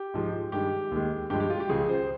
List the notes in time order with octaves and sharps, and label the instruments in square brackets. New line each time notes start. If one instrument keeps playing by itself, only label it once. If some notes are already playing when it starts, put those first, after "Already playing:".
Already playing: [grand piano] G4
G#2 F3 G#3
G2 D#3 G#3 G4
D#2 D#3 G#3
G2 F3 G#3 G4
G4
F4
G4
C#2 C#3 F3 G#4
C5